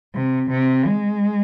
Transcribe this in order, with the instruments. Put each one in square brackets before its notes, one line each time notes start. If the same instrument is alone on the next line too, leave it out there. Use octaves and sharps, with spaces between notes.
[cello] C3
C3
G#3